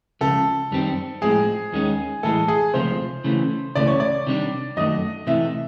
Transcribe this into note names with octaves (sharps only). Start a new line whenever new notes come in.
C#2 C#3 F3 A4
F#2 D#3 G3 C4
A2 F3 G#3 C4 G#4
D#2 D#3 G#3 C#4
A2 E3 G#3 A4
G#4
C#2 C3 F3 A3 C5
C#3 E3 A3
C#2 C#3 E3 A3 D5
C#5
D5
C3 D#3 G3 B3 D4
F#2 D#3 F#3 A3 D#5
C3 E3 A3 E5